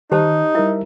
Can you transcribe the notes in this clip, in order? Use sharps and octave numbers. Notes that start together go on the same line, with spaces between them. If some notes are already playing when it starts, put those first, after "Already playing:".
D#3 D#4 G4 C5 A5
G3 E4 A#4 E5